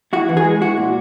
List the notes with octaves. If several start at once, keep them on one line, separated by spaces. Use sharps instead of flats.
E4 F#4
E3
G#4
G#3
E4 F#4
A#2